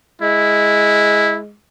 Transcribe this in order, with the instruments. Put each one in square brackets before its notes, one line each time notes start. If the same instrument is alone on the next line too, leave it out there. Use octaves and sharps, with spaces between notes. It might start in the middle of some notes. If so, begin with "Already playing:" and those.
[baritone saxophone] G#3 [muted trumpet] E4